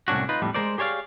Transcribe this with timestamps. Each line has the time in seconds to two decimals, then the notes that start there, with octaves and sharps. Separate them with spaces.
0.08 C2 A2 C#4 D4 F#4
0.29 D#4 F4 B4
0.42 F2 A2 G3
0.54 G#3 A3 A#4 C5 D5
0.78 G4 G#4 C#5 D5 F5